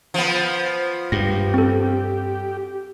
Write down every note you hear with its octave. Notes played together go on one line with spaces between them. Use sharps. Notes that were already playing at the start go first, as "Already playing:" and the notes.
F3 B3
G2 G4 A#6
C4 A4